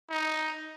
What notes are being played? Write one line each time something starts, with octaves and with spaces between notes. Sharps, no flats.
D#4